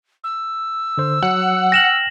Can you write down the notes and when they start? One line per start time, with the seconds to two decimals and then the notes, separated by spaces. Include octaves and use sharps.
0.24 E6
0.98 D3 C5
1.23 F#3 F#5
1.72 G5 F6 A#6 E7 F#7